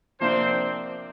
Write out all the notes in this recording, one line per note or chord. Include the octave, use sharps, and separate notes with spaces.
C3 F3 A#3 C4 D4 C5